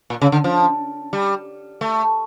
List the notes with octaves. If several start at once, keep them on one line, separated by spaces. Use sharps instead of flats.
A#2
C#3
D3
F3
G3
A3